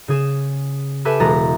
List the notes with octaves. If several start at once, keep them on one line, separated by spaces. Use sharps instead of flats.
C#3 G#4 E7
G4 A4 B4 E5 G#5 A5
E1 G#3 F#4 A#5 A6